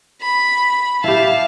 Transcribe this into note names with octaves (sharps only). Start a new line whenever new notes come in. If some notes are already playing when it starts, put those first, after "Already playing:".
B5
E4 G4 F5 A5